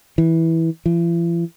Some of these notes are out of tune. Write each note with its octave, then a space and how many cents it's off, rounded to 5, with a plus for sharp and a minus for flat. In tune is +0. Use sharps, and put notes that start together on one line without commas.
E3 -15
E3 +45